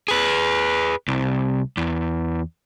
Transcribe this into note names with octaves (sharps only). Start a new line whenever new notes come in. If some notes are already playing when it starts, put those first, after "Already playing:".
G#4 B4
C2
E2